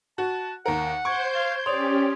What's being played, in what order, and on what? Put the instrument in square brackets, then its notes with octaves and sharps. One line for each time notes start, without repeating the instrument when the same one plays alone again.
[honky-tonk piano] F#4 [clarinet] A5 [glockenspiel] F#6
[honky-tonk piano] D#2 A#4 [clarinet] F#5
[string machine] C5 C6 G6 [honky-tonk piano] C#6 [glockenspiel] G#6 D7
[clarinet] F5 [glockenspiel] G#6 A6
[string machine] C#4 G4 [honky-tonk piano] C#5 [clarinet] D5 [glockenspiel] C6 D#6 F7